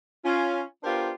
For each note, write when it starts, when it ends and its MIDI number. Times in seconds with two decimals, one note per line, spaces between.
0.24 0.61 61
0.24 0.61 65
0.83 1.09 59
0.83 1.09 62
0.83 1.09 65
0.83 1.09 67
0.83 1.09 70
0.83 1.09 72